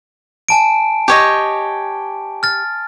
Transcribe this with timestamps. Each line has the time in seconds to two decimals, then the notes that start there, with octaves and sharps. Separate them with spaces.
0.49 G#5 A5 D7
1.08 G4 C#5 D#5
2.43 F6 A6